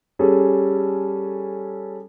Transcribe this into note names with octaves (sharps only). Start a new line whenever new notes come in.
G3 C#4 G#4 A4